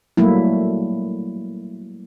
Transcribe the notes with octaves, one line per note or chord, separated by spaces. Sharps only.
F#3 G3 A3 A#3 E4